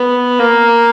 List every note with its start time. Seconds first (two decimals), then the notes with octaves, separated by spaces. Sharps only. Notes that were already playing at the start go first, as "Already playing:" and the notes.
Already playing: B3
0.39 A#3